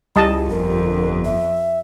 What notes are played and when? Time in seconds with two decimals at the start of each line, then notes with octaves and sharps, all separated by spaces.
0.16 C#2 G3 E4 D#5 A5
0.50 G1 F2 A#4
1.25 E5